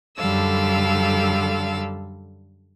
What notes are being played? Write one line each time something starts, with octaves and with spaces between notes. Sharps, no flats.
F#2 D3 G3 A4 F5 E6